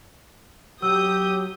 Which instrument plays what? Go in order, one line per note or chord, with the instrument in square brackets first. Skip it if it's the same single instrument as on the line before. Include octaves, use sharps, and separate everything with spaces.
[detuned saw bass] F#3 [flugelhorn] G4 [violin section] D#6 G6 [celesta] E6